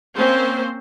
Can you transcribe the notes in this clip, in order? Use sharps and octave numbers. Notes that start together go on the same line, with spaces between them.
A#3 C4 C#4 C5